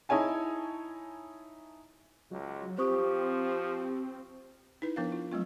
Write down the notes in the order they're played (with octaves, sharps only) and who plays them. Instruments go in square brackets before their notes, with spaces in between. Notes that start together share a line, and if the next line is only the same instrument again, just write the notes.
[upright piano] D#4 E4 C#5 G#5 A5
[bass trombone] C#2 [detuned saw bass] F#3
[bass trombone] F3 [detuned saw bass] C4 [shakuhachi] G4 [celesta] C5 C#6 D#6
[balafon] D#4 E4 B4
F3 B3 D4 A#4 F5
F4
F#3 A3 C4 F4